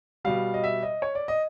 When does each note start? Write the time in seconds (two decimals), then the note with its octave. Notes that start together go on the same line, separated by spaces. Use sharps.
0.25 B2 G3 F5
0.54 D#5
0.64 E5
0.83 D#5
1.02 C#5
1.15 D5
1.28 D#5